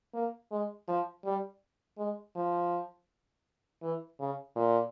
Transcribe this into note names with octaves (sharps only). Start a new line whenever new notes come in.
A#3
G#3
F3
G3
G#3
F3
E3
C#3
A#2